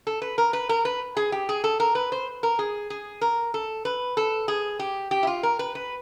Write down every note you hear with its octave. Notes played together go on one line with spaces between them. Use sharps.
A4
B4
A#4
B4
A#4
B4
G#4
G4
G#4
A4
A#4
B4
C5
A#4
G#4
G#4
A#4
A4
B4
A4
G#4
G4
G4
E4
F4
A#4
B4
B4